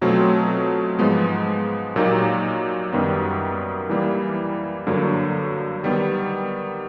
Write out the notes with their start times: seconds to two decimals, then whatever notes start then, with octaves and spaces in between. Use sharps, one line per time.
0.01 B2 F#3 A3 C4 F4
0.99 G#2 F3 G#3 B3
1.96 A#2 F#3 A#3 D#4 G4
2.92 F#2 D#3 G3 B3
3.89 E3 G3 A#3
4.87 G2 D3 F#3 A#3
5.83 D#3 G3 B3